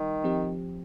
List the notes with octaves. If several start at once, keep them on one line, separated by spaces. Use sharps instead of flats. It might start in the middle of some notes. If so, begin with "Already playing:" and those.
Already playing: D#3 G3
F3 C4 G4